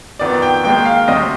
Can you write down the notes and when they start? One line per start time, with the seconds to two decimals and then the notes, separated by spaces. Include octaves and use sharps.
0.19 F2 D#3 B3 D5
0.42 G5
0.63 D#2 D#3 G#3 G5
0.85 F5
1.08 D2 C3 G3 C4 D#5